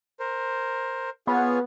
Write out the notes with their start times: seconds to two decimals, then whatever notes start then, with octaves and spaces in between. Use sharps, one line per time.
0.20 A#4 C5
1.27 B3 F4 G#4 C#5